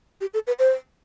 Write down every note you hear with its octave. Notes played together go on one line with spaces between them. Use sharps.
G4
A4
B4
C5